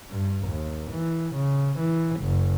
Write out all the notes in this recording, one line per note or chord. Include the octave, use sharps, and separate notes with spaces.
G2
D#2
E3
C#3
E3
F#1